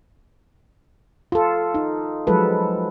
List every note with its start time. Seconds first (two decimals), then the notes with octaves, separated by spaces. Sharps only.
1.32 F4 A4
1.74 D#4
2.27 F3 F#3 G#3 A4 B4